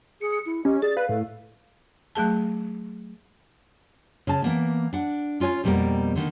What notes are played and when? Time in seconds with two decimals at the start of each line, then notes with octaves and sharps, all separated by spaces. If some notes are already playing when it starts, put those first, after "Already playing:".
0.21 G#4 C#7
0.46 E4
0.65 C#4 G4 D#5
0.82 G#4 D5 A6
0.97 B4 F5
1.09 A2 A4
2.15 F#3 A3 G#4 A5
4.27 C#3 A5
4.42 E3 A#3 B3
4.93 D4 F#5
5.40 C#4 F4 C#5 G#5
5.64 F2 B2 G3 A#3 A#4
6.16 D3 D#3 A#3